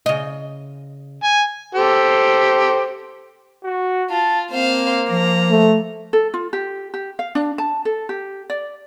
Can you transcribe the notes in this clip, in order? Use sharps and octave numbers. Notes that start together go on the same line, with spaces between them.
C#3 D#5
G#5
G4 A4 C5
F#4
F4 A5
A#3 C4 C5 F5
F3 A#5
A3
A4
F4
G4
G4
F5
D4
A5
A4
G4
D5